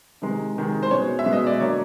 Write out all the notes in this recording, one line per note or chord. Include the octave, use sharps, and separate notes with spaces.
C3 D#3 G#3
C3 D#3 G#3
C5
B2 G#3 C#5
E5
B2 G#3
D#5
D5
D3 F#3 A#3 C#5